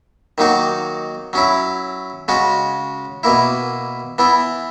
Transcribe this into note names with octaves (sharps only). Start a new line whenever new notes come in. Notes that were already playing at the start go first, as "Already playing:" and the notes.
D#3 F#3 A#3 D#4 F#4
F#3 C#4 E4
C#3 G#3 C#4 F#4
B2 A#3 E4
E3 B3 E4